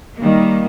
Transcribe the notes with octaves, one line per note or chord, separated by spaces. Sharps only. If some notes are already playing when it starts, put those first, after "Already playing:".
D#3 G3 A#3